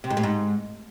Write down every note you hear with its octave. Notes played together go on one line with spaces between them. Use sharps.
C3
G#2
A2
G#2